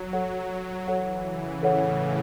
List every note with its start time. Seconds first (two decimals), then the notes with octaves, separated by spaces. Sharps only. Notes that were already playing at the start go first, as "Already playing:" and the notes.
Already playing: F#3
0.13 A4 C#5 F#5
0.87 E3 A4 C#5 F#5
1.26 C#3
1.63 A2 A4 C#5 F#5